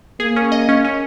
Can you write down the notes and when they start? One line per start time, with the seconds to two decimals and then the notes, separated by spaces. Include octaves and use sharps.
0.20 A#3 G#4
0.36 C#4
0.52 D#5
0.69 C#4
0.85 C#4